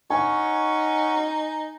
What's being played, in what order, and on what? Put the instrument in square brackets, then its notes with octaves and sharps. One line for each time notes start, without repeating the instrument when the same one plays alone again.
[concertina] C#4 F#4 C#6 [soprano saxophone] D#4 [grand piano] G#5